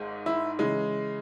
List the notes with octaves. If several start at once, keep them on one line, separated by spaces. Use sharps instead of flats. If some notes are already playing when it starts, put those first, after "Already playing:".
Already playing: G#1 G#2 G#3
E4
C#3 E3 G#3